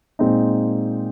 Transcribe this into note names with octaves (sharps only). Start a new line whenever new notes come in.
A#2 G#3 C4 D#4